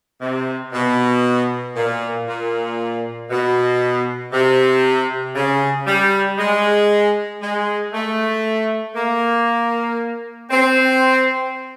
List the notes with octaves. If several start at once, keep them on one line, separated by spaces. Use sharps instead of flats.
C3
B2
A#2
A#2
B2
C3
C#3
G3
G#3
G#3
A3
A#3
C4